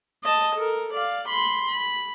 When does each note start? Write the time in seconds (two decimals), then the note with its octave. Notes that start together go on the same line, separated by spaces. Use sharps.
0.23 D#5 A5
0.55 A4 A#4
0.93 D5 F5
1.28 B5 C6
1.68 B5